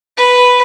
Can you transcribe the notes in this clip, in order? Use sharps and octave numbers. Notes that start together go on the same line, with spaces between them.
B4